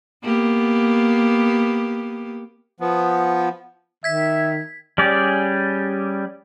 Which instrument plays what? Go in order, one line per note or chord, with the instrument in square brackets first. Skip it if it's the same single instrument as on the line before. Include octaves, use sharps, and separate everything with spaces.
[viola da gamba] A#3 B3 G4
[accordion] F3 B3
[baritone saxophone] D#3 [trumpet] E5 [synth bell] G#6 B6
[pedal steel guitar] G3 C#4 G4 G#4 D5